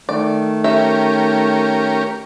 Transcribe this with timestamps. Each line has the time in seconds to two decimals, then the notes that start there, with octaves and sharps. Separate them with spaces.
0.09 D#3 A3 D5
0.64 C#4 G4 A#4 E5